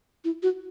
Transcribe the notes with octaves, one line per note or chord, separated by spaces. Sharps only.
E4
F#4